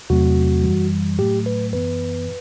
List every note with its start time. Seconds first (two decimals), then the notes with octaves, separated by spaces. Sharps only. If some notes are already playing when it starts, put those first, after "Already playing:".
0.10 E2 C3 F#3 A3 C4 F#4
0.64 F#2 E3 G3
1.19 A2 F#3 A3 G4
1.46 B4
1.73 F#2 E3 B3 B4